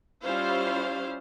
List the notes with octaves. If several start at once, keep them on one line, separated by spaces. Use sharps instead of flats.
G3 C#4 E4 F4 C5 F5